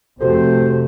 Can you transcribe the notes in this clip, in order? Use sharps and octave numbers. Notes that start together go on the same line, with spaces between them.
F1 C3 A3 F#4 G4 A4 C5